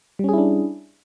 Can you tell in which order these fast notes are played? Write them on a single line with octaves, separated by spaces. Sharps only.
G3 C#4 G#4 E4 D4